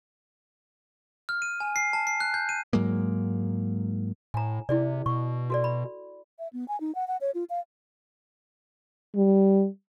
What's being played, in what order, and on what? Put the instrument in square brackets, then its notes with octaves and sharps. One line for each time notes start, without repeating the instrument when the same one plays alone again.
[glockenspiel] F6
D#7
G#5
C7
A5
C7
F#6
G6
D#7
[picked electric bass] G#2 F#3 G#3 A#3
[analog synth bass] A2 [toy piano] G#5 A#5
[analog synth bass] C3 [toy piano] E4 G#4 D5
[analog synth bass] B2 [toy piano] C#6
[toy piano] F#4 A4 D5
B5
[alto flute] E5
B3
G#5
D#4
F#5
F#5
C#5
F4
F5
[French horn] G3